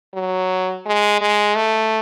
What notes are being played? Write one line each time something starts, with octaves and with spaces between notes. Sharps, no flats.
F#3
G#3
G#3
A3